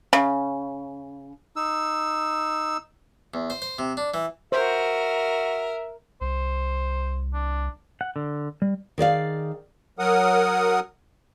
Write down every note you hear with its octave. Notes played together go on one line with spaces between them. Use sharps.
C#3
D#4 E6
E2
C5
C5
C3
D4
E3
F#4 A#4 C5 E5
C2 C5
D4
F#5
D3
G3
D#3 G#4 D5 F5
F#3 A#4 F#5 D#6